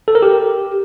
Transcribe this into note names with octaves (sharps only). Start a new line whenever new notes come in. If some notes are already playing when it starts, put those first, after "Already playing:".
A4
A#4
G4